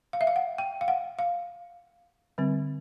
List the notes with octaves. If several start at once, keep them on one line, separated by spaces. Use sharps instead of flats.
F5
E5
F5
F#5
G5
F5
F#5
F5
D3 G3 C4